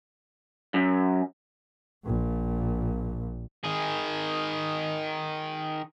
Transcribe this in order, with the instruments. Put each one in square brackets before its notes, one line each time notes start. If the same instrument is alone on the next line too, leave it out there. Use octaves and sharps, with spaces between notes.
[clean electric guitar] F#2
[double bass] A#1 A#2
[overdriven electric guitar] D#3 G#4